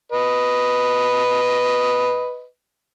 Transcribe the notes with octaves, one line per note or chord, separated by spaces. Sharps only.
B4 D#5